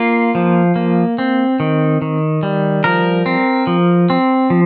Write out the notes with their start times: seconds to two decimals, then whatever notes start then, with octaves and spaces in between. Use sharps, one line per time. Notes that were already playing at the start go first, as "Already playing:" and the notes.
Already playing: A#3 F4
0.35 F3
0.76 A#3
1.18 C4
1.60 D#3
2.02 D#3
2.43 G3
2.84 F3 A#4
3.26 C4
3.67 F3
4.10 C4
4.50 F3